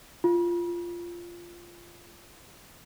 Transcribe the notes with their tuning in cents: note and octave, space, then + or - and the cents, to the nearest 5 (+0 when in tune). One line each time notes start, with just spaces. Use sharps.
F4 -10